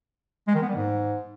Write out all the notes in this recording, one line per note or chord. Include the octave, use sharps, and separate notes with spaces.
G#3
D#3
B3
G3
G#2